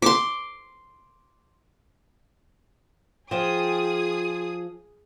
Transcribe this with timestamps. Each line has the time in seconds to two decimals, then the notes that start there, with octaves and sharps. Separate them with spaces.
0.02 C6 D6
3.31 F3 G#4 C5 G5 D#6